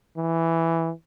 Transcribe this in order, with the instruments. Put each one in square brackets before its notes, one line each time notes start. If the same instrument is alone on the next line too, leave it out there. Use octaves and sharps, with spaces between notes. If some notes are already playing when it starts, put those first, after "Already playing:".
[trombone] E3